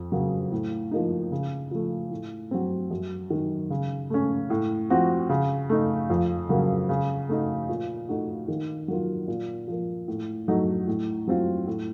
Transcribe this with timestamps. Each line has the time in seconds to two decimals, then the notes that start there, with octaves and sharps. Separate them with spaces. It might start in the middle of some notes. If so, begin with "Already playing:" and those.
Already playing: F2
0.12 C#3 F#3 A#3
0.52 A2
0.91 F3 A#3 D#4
1.31 C#3
1.71 F3 A3
2.11 A2
2.51 F#3 C4
2.91 F#2
3.30 D#3 F#3
3.70 C#3
4.10 A3 C#4
4.50 A2
4.90 F3 C4 F#4
5.29 C#3
5.69 A3 D#4
6.10 F2
6.49 C#3 F#3 A#3
6.89 C#3
7.29 A3 D#4 F#4
7.69 A#2
8.09 A3 D#4 F#4
8.48 D#3
8.88 F#3 A#3 F4
9.28 A#2
9.68 F3 A#3
10.08 A2
10.48 F#3 A3 D#4
10.87 A2
11.27 F#3 C4 F4
11.67 A2